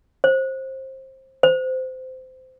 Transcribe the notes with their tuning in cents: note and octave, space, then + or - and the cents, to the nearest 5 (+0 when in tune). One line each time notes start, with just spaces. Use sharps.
C5 +20
C5 -20